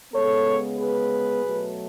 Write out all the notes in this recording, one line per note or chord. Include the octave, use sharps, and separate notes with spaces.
C#3 G#3 B3 A4 C#5
G#4 B4
B2 F#3 A3